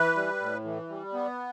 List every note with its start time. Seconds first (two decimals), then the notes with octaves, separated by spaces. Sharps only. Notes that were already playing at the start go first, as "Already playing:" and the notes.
Already playing: E3 B4
0.16 G3
0.40 A2
0.64 E3
0.89 G3
1.13 B3